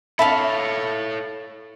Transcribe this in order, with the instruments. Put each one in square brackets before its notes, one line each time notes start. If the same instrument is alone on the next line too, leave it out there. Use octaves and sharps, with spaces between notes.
[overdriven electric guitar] A4 C#5 [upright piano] E5 [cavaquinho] F5 A5 B5